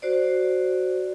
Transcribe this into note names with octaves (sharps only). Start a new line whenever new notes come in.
F#4 C5 D5